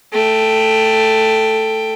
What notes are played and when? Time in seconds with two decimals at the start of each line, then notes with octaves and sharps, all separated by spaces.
0.13 A3 G5